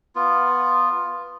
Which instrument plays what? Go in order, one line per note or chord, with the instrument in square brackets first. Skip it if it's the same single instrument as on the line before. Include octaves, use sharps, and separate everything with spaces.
[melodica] B3 F4